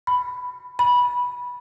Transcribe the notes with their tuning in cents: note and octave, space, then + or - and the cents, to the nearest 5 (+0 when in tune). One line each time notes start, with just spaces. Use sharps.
B5 +10
B5 -15